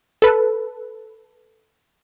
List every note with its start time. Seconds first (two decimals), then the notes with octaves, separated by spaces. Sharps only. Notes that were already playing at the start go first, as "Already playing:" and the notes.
0.22 A4 B4